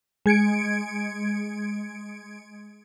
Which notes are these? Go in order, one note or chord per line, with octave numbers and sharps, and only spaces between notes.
G#3 G#6 C#7 D7